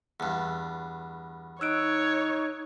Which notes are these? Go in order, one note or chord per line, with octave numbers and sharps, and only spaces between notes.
E2 G2
D#4 C#5 E6 F#6 D7